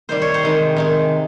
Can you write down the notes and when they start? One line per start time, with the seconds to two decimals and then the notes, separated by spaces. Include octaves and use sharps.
0.09 C3 D#3 G3 C5
0.22 C#5
0.34 C5
0.43 C3 D#3 G#3
0.77 C3 D#3 G#3